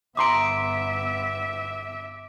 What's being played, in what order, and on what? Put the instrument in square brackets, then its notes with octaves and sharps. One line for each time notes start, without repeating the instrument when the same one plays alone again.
[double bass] G1 B3 [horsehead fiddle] E5 [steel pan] A#5 C6 D#6 [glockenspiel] D6 D7